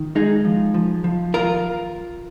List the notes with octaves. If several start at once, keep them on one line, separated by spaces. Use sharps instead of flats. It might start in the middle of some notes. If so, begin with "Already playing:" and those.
Already playing: D#3
G#3 D#4 G#4
F3
F3
F3
D#2 F4 A#4